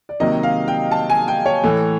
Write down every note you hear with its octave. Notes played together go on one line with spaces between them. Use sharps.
D5
C3 D#3 F#3 A#3 D#5
F5
G5
A5
G#5
G5
C#5
A2 E3 A3